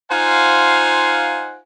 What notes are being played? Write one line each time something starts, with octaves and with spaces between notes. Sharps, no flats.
D#4 F4 C5 F5 F#5 G#5